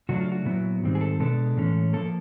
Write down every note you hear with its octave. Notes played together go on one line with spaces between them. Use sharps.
C#3 F#3 A3 D4 F#4
F4
F#4
A#2 F#3 B3 E4
G#2 D#3 G3 C4
G#4
A4
B2 G#3 B3 D4 A4
A2 E3 G#3 C#4
F3 A#3 A4